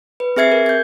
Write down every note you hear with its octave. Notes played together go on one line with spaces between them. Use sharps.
B4
C4 G#4 E5 G#6 C7
A#4
G6 G#6